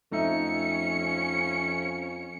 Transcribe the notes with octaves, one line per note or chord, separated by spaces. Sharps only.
F2 A3 C#4 D#4 E5 C#7